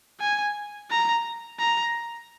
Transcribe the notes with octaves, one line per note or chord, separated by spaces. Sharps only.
G#5
A#5
A#5